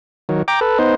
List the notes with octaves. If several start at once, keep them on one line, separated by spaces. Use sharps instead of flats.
D#3 F#3
G5 A#5 D6
A4 B4
B3 D#4 C5